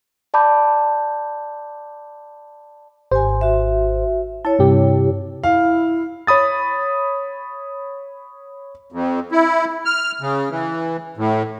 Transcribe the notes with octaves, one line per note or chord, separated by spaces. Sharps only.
D5 A5 B5 D6 G6
G#1 G4 C5 G#5
F#4 E5
E4 C#5 A5
G2 C3 G4
E4 F5
C#5 B5 D#6 A6
F2
E4
F6
C#3
E3
A2